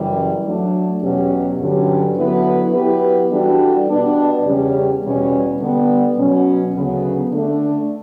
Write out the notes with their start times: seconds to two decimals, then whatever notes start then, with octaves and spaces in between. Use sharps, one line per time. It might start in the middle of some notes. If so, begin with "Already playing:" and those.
Already playing: F#2 C#3 E3 G3
0.45 F#3 A3 D4
1.02 E2 B2 F#3 C#4 G4
1.59 G2 D3 F#3 C#4 G4
2.16 D3 F#3 B3 E4 B4
2.73 F#3 B3 E4 G4 B4
3.31 E3 G3 D4 F#4 A4
3.88 B2 G3 B3 D4
4.45 E2 C#3 G3 C#4 G4
5.03 E2 B2 G3 C#4
5.60 D3 G3 B3
6.16 B2 F#3 C#4
6.74 D2 C#3 F#3 B3
7.31 D3 A3 D4 A4